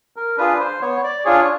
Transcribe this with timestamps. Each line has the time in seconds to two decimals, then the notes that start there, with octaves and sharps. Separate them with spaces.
0.16 A#4
0.37 D4 F4 G#4 B4
0.60 C5
0.82 B3 C#5
1.04 D5
1.25 D4 F4 G#4 C#5